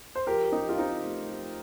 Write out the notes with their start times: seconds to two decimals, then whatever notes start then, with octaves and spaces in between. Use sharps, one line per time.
0.15 C5
0.27 F3 G4 A#4
0.52 F3 D#4 G4
0.69 F4
0.78 F3 C4 D#4
1.04 A3
1.30 F3